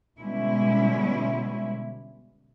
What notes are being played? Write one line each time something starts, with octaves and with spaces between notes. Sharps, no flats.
B2 D3 G3 G#3 C#4 E4